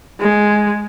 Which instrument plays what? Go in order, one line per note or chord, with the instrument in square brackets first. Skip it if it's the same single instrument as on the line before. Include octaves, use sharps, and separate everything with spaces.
[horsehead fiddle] G#3